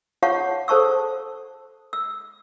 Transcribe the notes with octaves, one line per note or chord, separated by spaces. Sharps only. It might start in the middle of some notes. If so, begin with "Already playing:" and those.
F4 C#5 F5 F#5 A5 C#6
A4 C5 A5 C#6 E6
E6